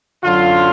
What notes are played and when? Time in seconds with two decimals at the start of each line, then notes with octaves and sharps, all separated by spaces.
0.24 F#2 D3 F#3 F4